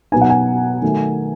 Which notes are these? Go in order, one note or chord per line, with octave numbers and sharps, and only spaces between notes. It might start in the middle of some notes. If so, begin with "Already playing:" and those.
B2 F#3 B3 D#4 G#5
F#5
G#5
D#3 F#3 A3